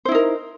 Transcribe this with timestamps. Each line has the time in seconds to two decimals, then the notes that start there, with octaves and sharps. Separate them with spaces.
0.05 C5
0.08 E4
0.12 D#4
0.15 A#4